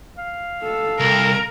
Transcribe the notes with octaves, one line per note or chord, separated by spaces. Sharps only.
F5
A4
C2 A#4